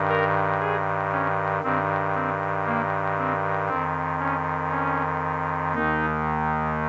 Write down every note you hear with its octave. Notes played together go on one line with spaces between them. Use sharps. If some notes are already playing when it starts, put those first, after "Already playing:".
Already playing: G2 D#3
A#4
G#4
C#4
G2 D#3 C4
C4
A#3
C4
F2 D#3 C4
C#4
C#4
D#2 D#3 D#4